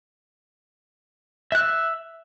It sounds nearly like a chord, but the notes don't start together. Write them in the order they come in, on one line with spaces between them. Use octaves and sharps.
E5 F#6 E6